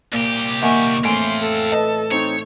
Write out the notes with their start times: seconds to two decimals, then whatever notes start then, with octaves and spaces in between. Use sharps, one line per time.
0.13 C2 A#2 G4
0.61 D#3 A#3 E5 F#5 G#5 C#6
1.05 A2 E3 C4 F5 G5 G#5 C6
1.41 A4
1.72 B4 D#5 A5
2.11 C4 D#4 C#5